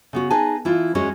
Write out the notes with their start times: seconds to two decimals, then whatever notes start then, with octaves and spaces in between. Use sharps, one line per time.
0.13 C#3 B3 F#4
0.30 D#4 G#4 B4 G#5 A5
0.65 E3 E4 F4
0.95 E2 G#3 C#4 F#4 G#4 C#5